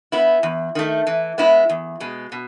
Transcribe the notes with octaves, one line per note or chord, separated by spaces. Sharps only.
B3 E4
E2
D#3 A3
E3
G#3 B3 E4
E2
B2 G#3
B2